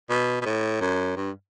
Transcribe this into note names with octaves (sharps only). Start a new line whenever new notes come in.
B2
B2
A2
F#2
G2